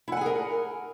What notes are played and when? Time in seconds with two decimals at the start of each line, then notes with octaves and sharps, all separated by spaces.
0.08 E4
0.12 F#5
0.17 G#5
0.21 G#4
0.26 A#4